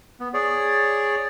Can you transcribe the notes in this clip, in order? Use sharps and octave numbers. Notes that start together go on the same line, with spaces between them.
B3
G#4 C#5 D5